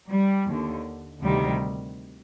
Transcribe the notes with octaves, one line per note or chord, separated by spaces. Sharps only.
G3
D#2 D3
D2 C3 D#3 G3